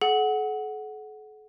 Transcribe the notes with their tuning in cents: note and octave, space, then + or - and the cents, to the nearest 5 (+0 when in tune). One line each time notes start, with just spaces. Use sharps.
A4 -45 F#5 +0